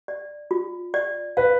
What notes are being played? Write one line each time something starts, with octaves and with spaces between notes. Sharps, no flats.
D5
F4
D5
B4 F5